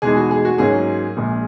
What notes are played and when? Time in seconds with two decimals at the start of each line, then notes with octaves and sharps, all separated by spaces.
0.02 E2 B2 G#3 D#4 G#4
0.17 F#4
0.31 G#4
0.45 F#4
0.58 G#2 F#3 A#3 C#4 G#4
1.17 A#1 A#2 G#3